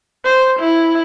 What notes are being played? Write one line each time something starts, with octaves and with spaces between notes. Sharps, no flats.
C5
E4